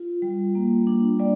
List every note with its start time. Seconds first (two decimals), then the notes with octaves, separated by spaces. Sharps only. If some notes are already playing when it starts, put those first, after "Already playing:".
Already playing: F4
0.22 G3
0.55 A#3
0.87 D4
1.20 G3 D5